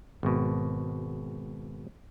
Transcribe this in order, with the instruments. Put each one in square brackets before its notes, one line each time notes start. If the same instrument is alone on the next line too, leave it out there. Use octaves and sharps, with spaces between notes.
[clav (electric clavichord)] G#1 B2